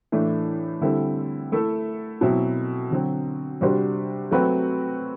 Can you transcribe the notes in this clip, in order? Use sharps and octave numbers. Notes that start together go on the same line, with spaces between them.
A2 E3 A3 D4
D3 G3 C4 E4 A4
A3 E4 A4
B2 F#3 C4 E4
D3 F#3 C4
C3 G3 D4 F#4 C5
F#3 A3 C4 F#4 B4